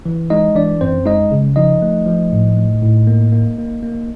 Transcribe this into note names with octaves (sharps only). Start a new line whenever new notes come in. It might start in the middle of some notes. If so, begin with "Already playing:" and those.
E3
G#3 D#4 D#5
E3 D4 D5
F#2 C4 C5
G#3 D#4 D#5
C#3
F3 D#4 D#5
A3
F3
A2
A3
A2
A#3
A#3
A#3
A#3